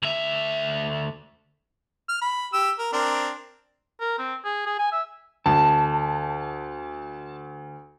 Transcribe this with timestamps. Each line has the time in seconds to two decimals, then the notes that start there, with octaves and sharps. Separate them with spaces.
0.02 D2 E5
2.09 F6
2.22 B5
2.53 G4 E6
2.79 A#4
2.93 C4 D4 A#4
4.01 A#4
4.18 C4
4.45 G#4
4.66 G#4
4.79 G#5
4.92 E5
5.46 D2 A5